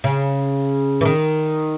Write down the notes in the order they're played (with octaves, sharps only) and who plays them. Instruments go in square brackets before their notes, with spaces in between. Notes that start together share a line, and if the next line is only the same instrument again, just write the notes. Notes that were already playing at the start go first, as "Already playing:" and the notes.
[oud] C#3
E3
D#3